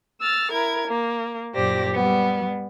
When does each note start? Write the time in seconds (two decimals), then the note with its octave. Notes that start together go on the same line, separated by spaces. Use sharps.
0.21 E6 F6 A6
0.52 E4 A#4 G#6
0.87 A#3
1.55 F#2 A#2 G4 C5 D5 A#6
1.94 G3 B3